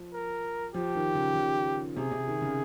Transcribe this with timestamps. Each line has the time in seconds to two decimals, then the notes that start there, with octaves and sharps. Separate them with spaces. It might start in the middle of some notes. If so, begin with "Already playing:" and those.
Already playing: F3
0.14 A#4
0.74 F3 G4
0.95 D#3
1.15 C#3
1.35 C#3
1.96 C3 G#4
2.11 C3
2.27 D#3
2.42 C#3